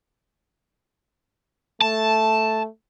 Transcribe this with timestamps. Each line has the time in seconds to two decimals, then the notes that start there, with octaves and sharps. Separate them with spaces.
1.82 A3 A5